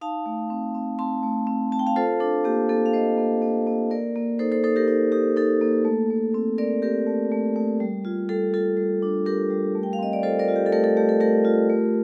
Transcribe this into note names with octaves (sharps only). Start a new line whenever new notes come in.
D#4 F5 A5
A3
C4
C4
C4 A5 C6
A3
C4
C4 A5
G5
F5 A5
F4 A4 C5
D4 A4
A#3 G4
A#3 A4
F5
A#3 C5 D#5
A#3
A#3
A#3
A#3 A#4 D5
A#3
D#4 A4 C5
A4 C5
D#4 A4 C5
G4 A#4
D#4
D#4 G4
D#4 A4
A#3
A3
A3
C4
C4 A#4 D5
C4 G4 A#4
A3
A3
A3
G3
F4
G3 A4
F4 A4
G3
D4
D4 G4 A#4
G3
A3
G5
F5
C4 D#5
D5
F4 A4 C5
A#4 D5
F4
G4
A4
A3 G4 A#4
A4
A3 G4
A4
A3 G4 A#4
F4
A3